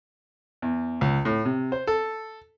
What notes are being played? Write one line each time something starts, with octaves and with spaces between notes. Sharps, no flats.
E2
C#2
A2
C3
C5
A4